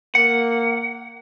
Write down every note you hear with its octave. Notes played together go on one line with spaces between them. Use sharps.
A#3 F#5